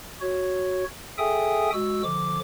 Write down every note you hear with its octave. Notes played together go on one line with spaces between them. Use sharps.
F#4 C#5
G#4 A4 E5 G5 G#5 D#6
G#3 F#4 E6
D3 F3 D6